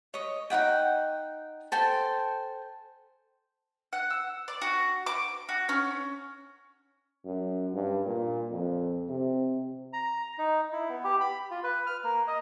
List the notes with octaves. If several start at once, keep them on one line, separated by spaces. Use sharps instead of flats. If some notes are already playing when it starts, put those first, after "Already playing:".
C#5 D#5
D#4 E4 F#5 G5
A4 C5 G5 G#5
F#5
E6
D5
F#4
D6
F#4
C#4
F#2
G2
A#2
F2
C3
A#5
D#4
E4
B3
G4
B5
F4
B4
F6
A#3
D#5